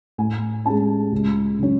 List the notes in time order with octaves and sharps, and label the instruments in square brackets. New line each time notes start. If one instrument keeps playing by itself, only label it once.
[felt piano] A2 G#5
G#3 C#4 A5
C#2
C#3 F#3 C#4